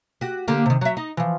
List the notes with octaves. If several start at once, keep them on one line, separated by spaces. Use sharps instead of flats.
F#4 G4
D3 A#3 G4
C3 D#3
F#3 E5
D#4
E3 F3